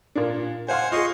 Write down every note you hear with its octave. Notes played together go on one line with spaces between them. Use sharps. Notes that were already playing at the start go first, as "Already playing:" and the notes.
A#2 A#3 D4
C5 F5 F#5 G#5 C6
F4 G#4 D#5 C6 C#6